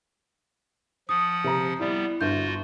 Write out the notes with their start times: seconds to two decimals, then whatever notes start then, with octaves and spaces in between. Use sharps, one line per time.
1.09 F3 F#5 D#6
1.44 C3 C5 A#5
1.80 G3 B3 E4 D5
2.21 G1 F4 F#4 G6